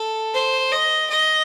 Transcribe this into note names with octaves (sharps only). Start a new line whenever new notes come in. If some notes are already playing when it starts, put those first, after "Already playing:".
Already playing: A4
C5
D#5
D#5